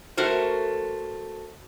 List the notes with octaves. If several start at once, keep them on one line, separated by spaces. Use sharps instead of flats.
A3 F#4 A#4 C5